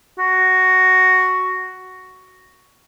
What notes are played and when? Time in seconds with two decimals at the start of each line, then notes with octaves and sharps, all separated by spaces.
0.19 F#4